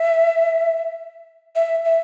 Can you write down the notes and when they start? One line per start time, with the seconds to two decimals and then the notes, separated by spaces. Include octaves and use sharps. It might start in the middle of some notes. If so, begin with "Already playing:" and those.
Already playing: E5
1.56 E5
1.85 E5